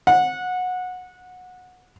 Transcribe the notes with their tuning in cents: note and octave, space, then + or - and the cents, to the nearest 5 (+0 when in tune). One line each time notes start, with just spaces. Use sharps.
F#5 -20